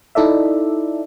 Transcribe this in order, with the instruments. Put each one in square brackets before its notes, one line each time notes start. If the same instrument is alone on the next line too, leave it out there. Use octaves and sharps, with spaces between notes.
[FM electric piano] D#4 E4 A4 D5 E5